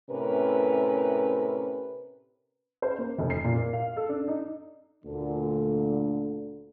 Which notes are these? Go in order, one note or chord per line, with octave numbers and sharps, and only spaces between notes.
A2 C3 C#4 A#4 B4
C5
A#3
F1
C7
A#2
A#4
F5
A4
D4
D#4
D2 A#2 D3